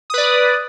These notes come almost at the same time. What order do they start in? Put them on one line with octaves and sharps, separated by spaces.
D#6 B4 D5